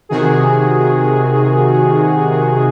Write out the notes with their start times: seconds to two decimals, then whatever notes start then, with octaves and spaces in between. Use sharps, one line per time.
0.09 C3 D#3 F#4 G#4